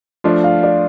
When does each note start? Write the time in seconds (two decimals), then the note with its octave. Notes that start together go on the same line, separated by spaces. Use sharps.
0.24 F3 A3 D4 F4 D5
0.44 F5
0.63 D5